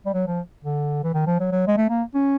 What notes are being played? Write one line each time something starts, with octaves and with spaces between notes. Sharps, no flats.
G3
F#3
F3
D3
E3
D#3
F3
F#3
F#3
G#3
A3
A#3
C#4